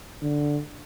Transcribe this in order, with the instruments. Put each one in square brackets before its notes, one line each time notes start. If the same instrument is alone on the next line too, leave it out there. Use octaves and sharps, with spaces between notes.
[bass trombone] D3